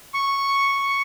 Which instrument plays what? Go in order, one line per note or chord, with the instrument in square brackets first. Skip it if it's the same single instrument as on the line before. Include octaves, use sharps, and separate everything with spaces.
[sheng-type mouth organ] C#6